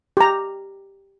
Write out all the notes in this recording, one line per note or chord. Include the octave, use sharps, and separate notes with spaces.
G4 A#5